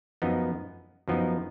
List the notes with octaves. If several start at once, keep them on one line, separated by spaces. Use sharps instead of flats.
F#2 F3 B3 D#4
F#2 F3 B3 D#4